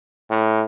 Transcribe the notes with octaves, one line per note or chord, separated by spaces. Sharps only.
A2